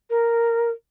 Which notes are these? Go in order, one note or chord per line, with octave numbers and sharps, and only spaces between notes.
A#4